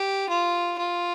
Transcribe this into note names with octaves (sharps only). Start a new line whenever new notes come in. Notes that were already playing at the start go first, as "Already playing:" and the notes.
Already playing: G4
F4
F4